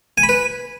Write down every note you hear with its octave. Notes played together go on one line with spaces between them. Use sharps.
G#5
B5
B4